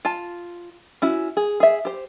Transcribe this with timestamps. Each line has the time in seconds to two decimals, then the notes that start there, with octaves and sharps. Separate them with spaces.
0.05 F4 A5
1.02 C#4 E4 F#4
1.37 G#4
1.60 G#4 E5
1.85 G4 C5